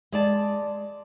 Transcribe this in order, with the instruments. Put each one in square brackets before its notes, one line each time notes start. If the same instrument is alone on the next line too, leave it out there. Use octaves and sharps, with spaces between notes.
[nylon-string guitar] G#3 D5 A5